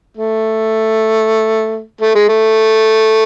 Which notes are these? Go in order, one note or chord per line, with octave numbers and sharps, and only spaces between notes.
A3
A3
G#3
A3